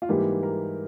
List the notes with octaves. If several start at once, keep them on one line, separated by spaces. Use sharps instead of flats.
F4
G#2 E3 G3 A#3 G4
A#4